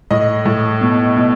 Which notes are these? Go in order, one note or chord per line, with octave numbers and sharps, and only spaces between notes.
A2 D#5
A2
B2
B2